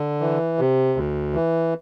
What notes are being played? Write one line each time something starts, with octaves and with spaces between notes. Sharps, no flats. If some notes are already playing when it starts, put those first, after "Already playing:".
Already playing: D3
E3
C3
D2
E3